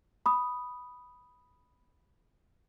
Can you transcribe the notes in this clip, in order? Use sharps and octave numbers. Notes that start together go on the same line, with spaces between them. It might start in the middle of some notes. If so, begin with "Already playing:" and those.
B5 D#6